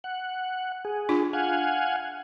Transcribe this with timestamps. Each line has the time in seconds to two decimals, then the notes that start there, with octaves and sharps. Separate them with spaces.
0.04 F#5
0.85 G#4
1.09 D4 F4
1.33 F5 F#5 G#5